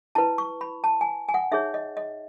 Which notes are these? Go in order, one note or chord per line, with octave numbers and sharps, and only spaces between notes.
E4 B4 A5
C#6
B5
A5
G#5
G#5
F#5
D#4 G#4 C#5 E5
D#5
D#5